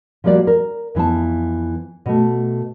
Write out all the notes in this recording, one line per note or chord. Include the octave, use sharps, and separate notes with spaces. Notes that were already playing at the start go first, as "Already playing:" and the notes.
F3 G3 A#3 F#4 D5
A#4
F2 E3 B3 A5
B2 A3